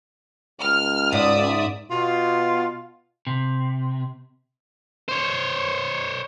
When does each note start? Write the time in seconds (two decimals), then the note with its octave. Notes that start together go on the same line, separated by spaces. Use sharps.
0.61 C#2 F6
1.13 G#2 D5 E5 D#6
1.91 B2 F4
3.27 C3
5.08 C5 C#5